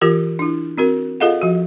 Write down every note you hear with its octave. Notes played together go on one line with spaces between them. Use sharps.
E3 F4 G4 A#4
D4 E4
C4 F#4 A#4
F4 G#4 A4 D#5 F5 F#5
F3 F#4